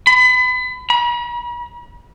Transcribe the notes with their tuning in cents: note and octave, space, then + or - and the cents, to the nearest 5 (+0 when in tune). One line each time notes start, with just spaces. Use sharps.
B5 +30
B5 -45